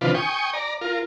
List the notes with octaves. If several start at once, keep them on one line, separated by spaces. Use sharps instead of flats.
C3 D#3 F3 D4 F4 B4
G5 G#5 C#6 D#6
D5 A#5
F4 A#4